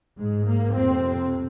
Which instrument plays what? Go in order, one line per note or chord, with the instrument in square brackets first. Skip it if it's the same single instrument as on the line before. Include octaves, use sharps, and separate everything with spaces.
[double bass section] G#2 G#3
A#3
F2 C3 C4